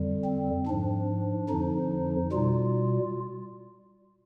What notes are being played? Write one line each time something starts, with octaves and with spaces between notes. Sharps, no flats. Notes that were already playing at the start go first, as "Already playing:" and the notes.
Already playing: F2 D3 G3
C4
G#2 F3 D4
F2 D3 F3 D#4
B2 G3 F4